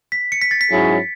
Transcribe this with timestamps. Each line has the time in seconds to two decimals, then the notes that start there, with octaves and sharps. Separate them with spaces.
0.12 B6
0.32 C#7
0.42 B6
0.51 A6
0.61 B6
0.71 G#2 F#3 C#4 E4 G#4